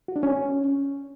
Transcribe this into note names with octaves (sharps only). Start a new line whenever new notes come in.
F#4
D4
C#4